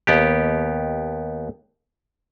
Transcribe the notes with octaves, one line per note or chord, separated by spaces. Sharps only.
D#2 B3 G4